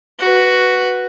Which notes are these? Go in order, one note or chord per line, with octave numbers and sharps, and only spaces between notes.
F#4 B4